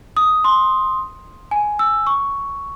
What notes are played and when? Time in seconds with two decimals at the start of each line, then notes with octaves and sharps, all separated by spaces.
0.17 D#6
0.44 C6
1.51 G#5
1.79 E6
2.07 C#6